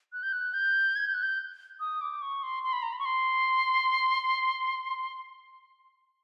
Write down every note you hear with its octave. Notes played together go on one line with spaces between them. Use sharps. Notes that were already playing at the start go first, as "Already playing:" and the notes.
F#6
G6
F#6
G6
G#6
G6
F#6
G6
D#6
D6
C#6
C6
C6
B5
A#5
B5
C#6
C6